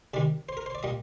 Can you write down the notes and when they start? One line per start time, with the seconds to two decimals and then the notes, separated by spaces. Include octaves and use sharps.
0.14 C3 D#3 G3 D5
0.49 C5
0.57 A#4
0.66 C5
0.75 D5
0.83 A#2 G3 D#5